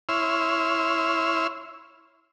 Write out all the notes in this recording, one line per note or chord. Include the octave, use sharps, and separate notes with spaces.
E4 C#5 C6 E6 F6